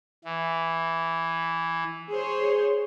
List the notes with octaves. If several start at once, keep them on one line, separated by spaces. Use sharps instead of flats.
E3
G#4 C5 C#5